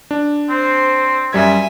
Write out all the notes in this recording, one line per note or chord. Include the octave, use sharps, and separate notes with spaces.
D4
C4 C5
F#2 G3 E5 G#5 G#6